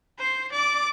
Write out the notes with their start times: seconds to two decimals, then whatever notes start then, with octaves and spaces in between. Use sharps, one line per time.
0.18 C5 C7
0.52 D5 D6